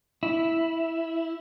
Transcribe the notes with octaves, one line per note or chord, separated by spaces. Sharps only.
E4